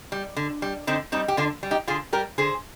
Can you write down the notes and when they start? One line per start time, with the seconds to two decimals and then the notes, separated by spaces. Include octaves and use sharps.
0.12 G3
0.36 D3
0.62 G3
0.87 D3 C4 D#4
1.12 G3 C4 D#4
1.28 G4
1.37 D3 D4 F4
1.63 G3
1.71 D#4 G4
1.87 D3 F4 G#4
2.13 G3 G4 A#4
2.38 D3 G#4 C5